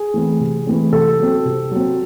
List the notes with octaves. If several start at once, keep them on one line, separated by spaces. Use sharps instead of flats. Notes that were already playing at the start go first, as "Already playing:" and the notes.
Already playing: G#4
E3 A3 C4
C3
E3 A3 C4
C3 A4
F#3 C4
C3
F#3 C4